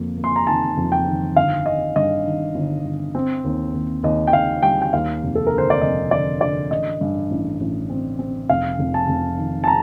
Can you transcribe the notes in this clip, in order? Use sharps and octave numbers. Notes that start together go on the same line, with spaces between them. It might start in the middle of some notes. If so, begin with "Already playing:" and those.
Already playing: F2 A#3
A#3
C6
A#5
D#3 A5
F2
G5
D#3
G1 F5
D#3 D#5
G2 D#5
D#3
G1
G1
C4
D#2
D#2
D#2 D#5
G5
D#2 F5
G3 G5
G5
D#2 F5
F1
A4
A#4
D3
C5
D5
F1 D#5
D3 D5
D3 D5
A1 D#5
G2
A1
A1
C4
C4
F1 F5
F1
A5
F1
D#3
A5
A#5